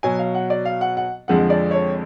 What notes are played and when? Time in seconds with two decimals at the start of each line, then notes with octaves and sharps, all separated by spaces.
0.03 B2 F#3 G#5
0.19 F5
0.35 F#5
0.50 D5
0.65 F5
0.81 F#5
0.97 F#5
1.28 F2 D3 F3 G#3 F#5
1.50 D5
1.71 C#5